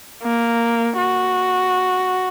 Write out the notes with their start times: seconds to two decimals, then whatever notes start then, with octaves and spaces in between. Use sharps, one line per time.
0.24 A#3
0.98 F#4